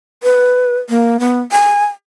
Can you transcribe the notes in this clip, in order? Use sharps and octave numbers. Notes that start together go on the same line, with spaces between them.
B4
A#3
B3
G#5